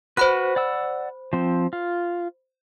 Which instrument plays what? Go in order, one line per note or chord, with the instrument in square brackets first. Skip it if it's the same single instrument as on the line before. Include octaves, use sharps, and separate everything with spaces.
[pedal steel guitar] F#4 B4 [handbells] C5 B5 F#6
[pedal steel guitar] D5 F#5 E6
F3 C4
F4